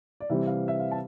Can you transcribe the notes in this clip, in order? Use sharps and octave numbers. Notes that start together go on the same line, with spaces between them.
D5
C3 E3 G3 C4 E5
F5
E5
F5
A5